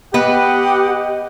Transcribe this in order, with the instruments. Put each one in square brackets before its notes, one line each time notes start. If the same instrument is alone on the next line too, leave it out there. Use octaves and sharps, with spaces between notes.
[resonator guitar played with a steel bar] B3 [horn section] G4 F#5 [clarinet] D#5